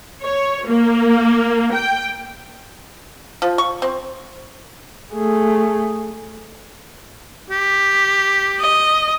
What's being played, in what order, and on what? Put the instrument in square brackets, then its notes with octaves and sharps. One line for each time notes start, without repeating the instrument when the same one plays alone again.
[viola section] C#5
A#3
G5
[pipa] F3
C#6
C4
[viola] A3 G#4
[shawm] G4
[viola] D#5